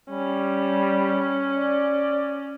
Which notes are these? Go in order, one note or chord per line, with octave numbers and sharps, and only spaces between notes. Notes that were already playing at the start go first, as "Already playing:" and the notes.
G3 C#4
D5